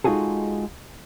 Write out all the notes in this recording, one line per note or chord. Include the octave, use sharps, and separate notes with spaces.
G#3 D#4 F4 F#4 G#4 A4